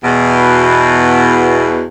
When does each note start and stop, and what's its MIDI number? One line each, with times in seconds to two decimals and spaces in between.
0.04 1.83 40
0.04 1.83 47